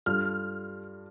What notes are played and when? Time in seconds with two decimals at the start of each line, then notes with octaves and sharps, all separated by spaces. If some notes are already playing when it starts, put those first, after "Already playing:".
0.06 G2 G3 F4 A4 F6